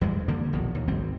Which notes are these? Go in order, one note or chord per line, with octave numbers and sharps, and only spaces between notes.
E2 G2 G3 G#3
D3 F3 G3 A#3
A#1 E2 B2
D#2
G#1 G3 C4